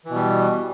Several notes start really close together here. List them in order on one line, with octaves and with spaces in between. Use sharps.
E3 B2 G3